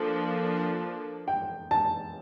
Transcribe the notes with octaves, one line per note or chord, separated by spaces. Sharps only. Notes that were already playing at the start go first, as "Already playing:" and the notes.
Already playing: F3 A#3 D4 A4
G5
A5